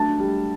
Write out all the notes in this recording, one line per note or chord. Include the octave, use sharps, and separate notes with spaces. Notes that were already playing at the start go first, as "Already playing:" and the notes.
Already playing: F#3 A3 D4 A5
G3